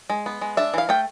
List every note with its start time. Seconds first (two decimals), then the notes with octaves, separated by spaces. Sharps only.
0.10 G#3
0.26 B3
0.41 G#3
0.57 D4 E5
0.74 E3 F5
0.89 A3 G5